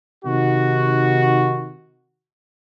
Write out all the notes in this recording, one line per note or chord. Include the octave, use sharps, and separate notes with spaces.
C3 D#3 D#4 F#4